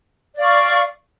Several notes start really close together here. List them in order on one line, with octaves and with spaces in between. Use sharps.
D5 F5 C#6